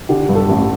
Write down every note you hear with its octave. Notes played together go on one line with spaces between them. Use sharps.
D3 G4
G2
A4
A1